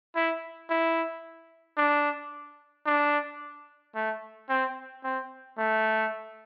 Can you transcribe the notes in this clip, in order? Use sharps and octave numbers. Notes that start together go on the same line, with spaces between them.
E4
E4
D4
D4
A3
C4
C4
A3